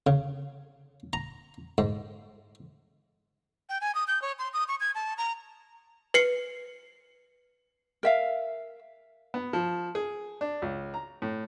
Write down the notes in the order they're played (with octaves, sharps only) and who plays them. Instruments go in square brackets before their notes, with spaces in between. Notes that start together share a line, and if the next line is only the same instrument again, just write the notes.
[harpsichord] C#3
A#5
G#2
[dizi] G5
G#5
D#6
G6
C#5
C6
D#6
C#6
G#6
A5
A#5
[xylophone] B4 C7 C#7
[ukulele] A#4 E5 F5
[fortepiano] B3
F3
G#4
D4
C#2
A#5
A2